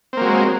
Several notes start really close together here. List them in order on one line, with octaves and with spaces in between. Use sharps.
C4 A#3 F#3 G#3